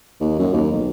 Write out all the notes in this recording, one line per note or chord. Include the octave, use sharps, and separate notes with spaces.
D#2
F#2
D#2
B1